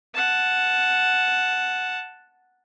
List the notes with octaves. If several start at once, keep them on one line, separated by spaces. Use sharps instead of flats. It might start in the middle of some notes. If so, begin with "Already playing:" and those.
F#5 A5